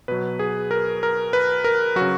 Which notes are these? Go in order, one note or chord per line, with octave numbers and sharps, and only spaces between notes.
B2 F#3 B4
G#4
A#4
A#4
B4
A#4
F#3 F#4
C#3